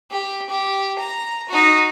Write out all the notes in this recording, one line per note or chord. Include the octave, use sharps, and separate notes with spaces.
G4
G4
A#5
D#4 F#4